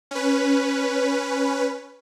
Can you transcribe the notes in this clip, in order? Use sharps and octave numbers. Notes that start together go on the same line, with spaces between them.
C#4 B4